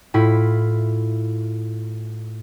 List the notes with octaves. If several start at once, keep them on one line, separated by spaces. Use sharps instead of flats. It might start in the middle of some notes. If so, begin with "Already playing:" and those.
A2 E4 F4 B6